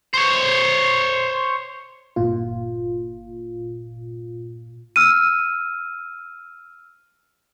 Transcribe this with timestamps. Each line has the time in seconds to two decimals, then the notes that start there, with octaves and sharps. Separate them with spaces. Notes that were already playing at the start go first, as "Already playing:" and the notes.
0.14 C5 C#5
2.16 G1 A#2 F4
4.96 E6 F6 D#7